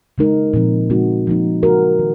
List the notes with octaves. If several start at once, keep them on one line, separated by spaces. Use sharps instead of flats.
C#3 G#3 D#4 A#4
A#2 F3 C4
C#3 G#3 C4 D#4 F#4
A#2 F3 A#3 D#4
C#3 G#3 D#4 F#4 A#4
D#3